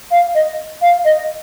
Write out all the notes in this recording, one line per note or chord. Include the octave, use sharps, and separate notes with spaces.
F5
D#5
F5
D#5